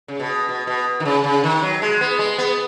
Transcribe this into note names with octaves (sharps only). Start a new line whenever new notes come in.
C#3
B2
B2
B2
D#3
C#3
C#3
D#3
F#3
G#3
B3
G#3
B3